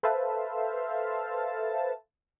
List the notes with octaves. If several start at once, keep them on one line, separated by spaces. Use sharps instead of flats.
A4 B4 C5 E5 F5 A5